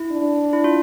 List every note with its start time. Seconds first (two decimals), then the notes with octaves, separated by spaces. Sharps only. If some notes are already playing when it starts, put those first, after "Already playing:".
Already playing: E4
0.12 D4
0.53 E4
0.64 F4